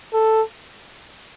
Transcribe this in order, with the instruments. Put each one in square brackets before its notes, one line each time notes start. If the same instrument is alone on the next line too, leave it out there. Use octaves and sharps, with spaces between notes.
[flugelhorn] A4